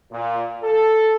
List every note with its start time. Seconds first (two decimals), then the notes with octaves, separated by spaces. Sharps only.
0.12 A#2
0.63 A4